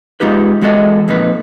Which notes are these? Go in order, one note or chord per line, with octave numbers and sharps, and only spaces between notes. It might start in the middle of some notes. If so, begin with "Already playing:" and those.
G#3 D#4 F4 G4 B4
E2 G#3 F#4 A4 D#5
F2 A#2 D#4 B4